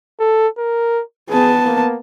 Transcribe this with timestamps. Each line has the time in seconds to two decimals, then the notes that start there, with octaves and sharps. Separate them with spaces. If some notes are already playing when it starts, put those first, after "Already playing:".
0.20 A4
0.58 A#4
1.30 B3 G#4 A5
1.65 A#3